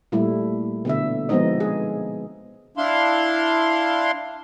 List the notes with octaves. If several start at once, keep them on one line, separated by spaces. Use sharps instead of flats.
A#2 G3 A3 E4
B2 D3 E5
F3 G#3 B3 C4 D#4 D#5
G#4
D4 E4 F5 C6